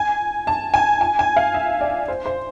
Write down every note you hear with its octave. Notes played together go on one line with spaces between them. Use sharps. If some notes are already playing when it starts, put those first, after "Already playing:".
Already playing: G#5
A5
G#5
G#5
G#5
F5
E5
D5
C5
C5